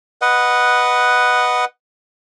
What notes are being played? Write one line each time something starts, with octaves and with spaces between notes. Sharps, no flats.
B4 D#5 F#5